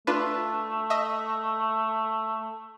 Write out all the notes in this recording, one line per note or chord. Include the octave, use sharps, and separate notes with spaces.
A3 D4 F4 B4
D#5 E5